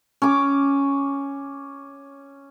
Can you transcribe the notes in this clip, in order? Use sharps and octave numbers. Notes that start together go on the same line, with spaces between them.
C#4 D6